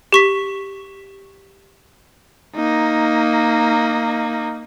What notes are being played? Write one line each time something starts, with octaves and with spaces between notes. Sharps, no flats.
G4 C#6 B6
A#3 D#4